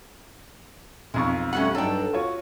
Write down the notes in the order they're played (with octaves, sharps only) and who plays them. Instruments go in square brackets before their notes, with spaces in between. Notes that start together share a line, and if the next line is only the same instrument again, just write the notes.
[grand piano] B1 F2 C#6 [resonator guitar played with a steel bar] G#3
[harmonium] G3 A3 [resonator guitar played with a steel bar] C#4 F#4 F#5
[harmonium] G2 D4 [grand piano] F#3 D#4 [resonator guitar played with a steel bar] A4 G5
[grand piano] F4 C#5 [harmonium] F#4